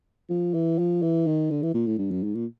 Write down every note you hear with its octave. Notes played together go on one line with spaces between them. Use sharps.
F3
E3
F3
E3
D#3
D3
E3
A#2
A2
G2
F#2
G#2
A#2